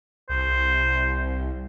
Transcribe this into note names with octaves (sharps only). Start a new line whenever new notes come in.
C2 C5